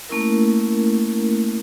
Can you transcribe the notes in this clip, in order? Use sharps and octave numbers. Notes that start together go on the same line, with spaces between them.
A3 A#3 C#4 E4 A#4